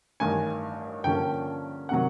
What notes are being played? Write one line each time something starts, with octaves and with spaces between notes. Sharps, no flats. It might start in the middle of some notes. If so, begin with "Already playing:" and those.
A1 G2 D#3 G#5
G2 D3 F3 A#3 C#4 G5
C3 D#3 F#3 F#5